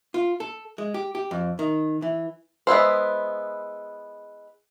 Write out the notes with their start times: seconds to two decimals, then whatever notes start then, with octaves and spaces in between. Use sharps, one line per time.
0.14 F4
0.40 A4
0.78 G#3
0.94 G4
1.15 G4
1.31 F2
1.59 D#3
2.02 E3
2.67 G#3 B3 E4 C5